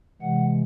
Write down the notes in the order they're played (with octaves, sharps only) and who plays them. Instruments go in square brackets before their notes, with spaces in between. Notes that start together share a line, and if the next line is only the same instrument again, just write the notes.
[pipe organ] C3 E3 G#3 F#5